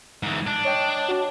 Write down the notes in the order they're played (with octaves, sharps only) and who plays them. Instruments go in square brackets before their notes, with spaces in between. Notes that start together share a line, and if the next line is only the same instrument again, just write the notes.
[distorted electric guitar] G#2 E3
D4
[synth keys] C#5 D#5 G5
F#4 A5 D6